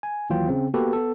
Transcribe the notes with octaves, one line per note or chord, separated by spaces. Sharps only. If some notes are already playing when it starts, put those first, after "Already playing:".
G#5
D#2 E3 F#3 F4 G5
C#3 C4
A#3 B3 F#4 G4 A4 B4
B3 A4